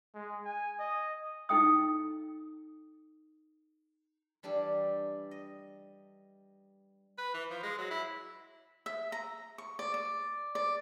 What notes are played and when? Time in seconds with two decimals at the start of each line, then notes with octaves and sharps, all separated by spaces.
0.15 G#3
0.45 G#5
0.79 D#5
1.49 D#4 E4 A4 G5 D#6
4.43 E3 G3 D4 G4 A4
5.31 D#5
7.18 B4
7.34 E3
7.51 F3
7.63 G#3
7.79 F#3
7.91 E4
8.86 E5
9.12 A#5
9.58 C#6
9.79 D5
9.94 D5
10.55 D5